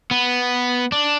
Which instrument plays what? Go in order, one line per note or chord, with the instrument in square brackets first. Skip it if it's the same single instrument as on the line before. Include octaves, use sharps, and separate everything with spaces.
[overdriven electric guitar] B3
D4